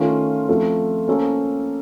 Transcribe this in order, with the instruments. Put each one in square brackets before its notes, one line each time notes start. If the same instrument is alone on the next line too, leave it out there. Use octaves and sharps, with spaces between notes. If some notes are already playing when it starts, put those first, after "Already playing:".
Already playing: [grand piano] D#3 A3 C#4 F4 A#4
F3 A3 C4 F4 A4
A#3 C#4 A4 C5